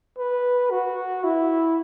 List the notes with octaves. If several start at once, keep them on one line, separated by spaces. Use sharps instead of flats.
B4
F#4
E4